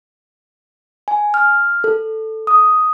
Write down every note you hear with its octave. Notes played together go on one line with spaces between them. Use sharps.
G#5
F6
A4
D#6